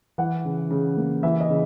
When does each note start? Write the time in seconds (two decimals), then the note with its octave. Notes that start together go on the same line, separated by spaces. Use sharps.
0.18 E3 F#5
0.45 C#3
0.70 C#3
0.97 A#3
1.23 E3 E5
1.40 D#5
1.49 C#3